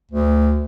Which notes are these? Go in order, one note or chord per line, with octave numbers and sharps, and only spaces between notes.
D2